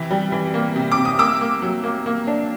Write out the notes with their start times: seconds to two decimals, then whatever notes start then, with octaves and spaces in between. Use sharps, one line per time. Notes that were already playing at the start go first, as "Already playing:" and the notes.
Already playing: C3 E3
0.11 G3
0.32 E3
0.54 A#3
0.76 C3
0.92 D6
0.97 C3
1.05 D#6
1.19 A#3 D6 E6
1.41 A#3
1.62 F#3
1.84 A#3
2.06 A#3
2.27 D4